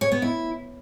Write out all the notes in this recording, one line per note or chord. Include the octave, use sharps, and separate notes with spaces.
C#5
B3
E4